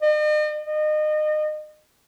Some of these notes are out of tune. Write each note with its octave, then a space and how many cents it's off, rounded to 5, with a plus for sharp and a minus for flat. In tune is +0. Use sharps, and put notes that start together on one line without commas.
D#5 -45
D#5 -30